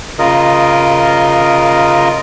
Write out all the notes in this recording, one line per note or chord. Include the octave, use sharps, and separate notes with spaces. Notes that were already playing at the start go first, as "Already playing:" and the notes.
C#3 F4 A#4 D#5